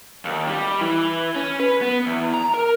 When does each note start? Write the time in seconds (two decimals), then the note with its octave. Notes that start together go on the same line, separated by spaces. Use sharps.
0.25 D#2
0.47 G3
0.81 E3
1.35 C#4
1.59 B4
1.81 B3
2.06 E2
2.33 A#5
2.54 A#4